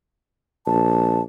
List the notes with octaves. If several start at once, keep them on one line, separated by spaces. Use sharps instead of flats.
A#1 A5